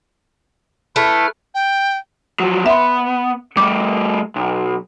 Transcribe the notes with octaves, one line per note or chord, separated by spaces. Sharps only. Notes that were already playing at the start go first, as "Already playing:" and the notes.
A3 E4 B4 F6
G5
F3 F#3
B3 E5 C6
G3 A3 D6
B1